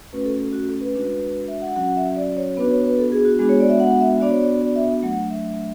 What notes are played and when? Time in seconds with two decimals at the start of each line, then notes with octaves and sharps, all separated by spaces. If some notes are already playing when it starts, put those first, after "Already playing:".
0.13 A3 C#4 F#4 B4
0.26 A4
0.40 A4
0.53 F#4
0.68 A4
0.81 B4
0.94 G#3 D4 F#4
1.48 E5
1.62 F#5
1.76 F#3 C#4 F#4 F#5
1.96 E5
2.16 D5
2.37 C#5
2.57 B3 D4 F#4 B4
2.71 C#5
2.84 B4
2.99 A4
3.12 G#4
3.25 F#4
3.39 G#3 B3 D4 F#4 G#4
3.49 C#5
3.60 D5
3.69 E5
3.80 F#5
4.01 E5
4.20 B3 D4 F#4 D5
4.31 C#5
4.41 D5
4.62 D5
4.76 E5
5.02 F#3 A3 D4 F#5
5.30 E5